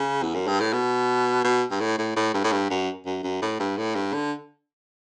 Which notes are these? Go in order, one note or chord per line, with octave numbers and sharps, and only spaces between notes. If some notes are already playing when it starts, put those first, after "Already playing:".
Already playing: C#3
E2
F#2
G2
A2
B2
B2
G2
A2
A2
A2
G2
A2
G2
F#2
F#2
F#2
A2
G2
A2
G2
D3